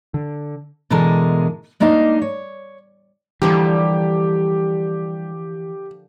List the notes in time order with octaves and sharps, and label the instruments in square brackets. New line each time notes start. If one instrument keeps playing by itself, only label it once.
[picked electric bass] D3
[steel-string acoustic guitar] B2 D3 E3 G#3 A#4 A5
G#3 A#3 D4 D#4 D#5 F5
C#5
[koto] D3 F3 A#3 [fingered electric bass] E3 [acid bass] G3 [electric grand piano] G4